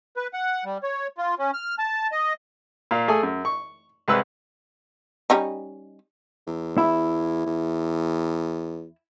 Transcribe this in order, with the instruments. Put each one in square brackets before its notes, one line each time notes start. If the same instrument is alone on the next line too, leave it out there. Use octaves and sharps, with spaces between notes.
[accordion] B4
F#5
G3
C#5
F4
C#4
F6
A5
D#5
[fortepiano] A#2 F5
A3 G#4 A4 G#5
F#2
C#6
C2 G#3 B4 E6 F#6
[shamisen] G3 C#4 D#4
[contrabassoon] E2
[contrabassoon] E2 [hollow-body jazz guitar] E4
[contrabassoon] E2